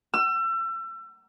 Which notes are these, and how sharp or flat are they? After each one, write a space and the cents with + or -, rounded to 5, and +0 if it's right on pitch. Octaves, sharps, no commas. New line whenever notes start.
E6 +35